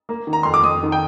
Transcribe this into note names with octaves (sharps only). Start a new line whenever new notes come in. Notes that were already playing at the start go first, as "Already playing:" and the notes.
A#3
D#3
A#5
F2 C6
D6
F2 D#6
D#3
G5